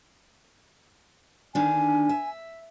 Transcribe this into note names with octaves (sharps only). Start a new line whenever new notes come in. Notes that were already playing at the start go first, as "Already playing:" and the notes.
D3 D#3 D4 G#5
E5